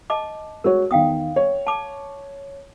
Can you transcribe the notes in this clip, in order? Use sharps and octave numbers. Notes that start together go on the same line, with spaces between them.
D#5 A5 D6
G#3 F#4 A#4 C#5
E2 D#3 F5 G5 D#6
C#5
A5 D6